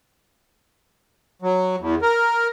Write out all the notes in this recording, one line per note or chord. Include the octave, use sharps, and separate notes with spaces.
F#3
E2
A#4